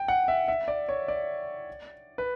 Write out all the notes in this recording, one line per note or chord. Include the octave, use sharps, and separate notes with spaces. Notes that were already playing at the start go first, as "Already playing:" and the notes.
Already playing: G5
F#5
E5
E5
D5
C#5
D5
B4